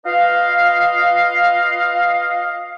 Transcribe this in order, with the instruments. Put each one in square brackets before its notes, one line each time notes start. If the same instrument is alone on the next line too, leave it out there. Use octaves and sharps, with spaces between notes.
[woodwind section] F4 B4 D#5 F5